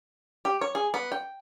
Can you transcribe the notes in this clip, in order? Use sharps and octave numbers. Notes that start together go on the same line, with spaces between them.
G4
C#5
G#4
B3
G5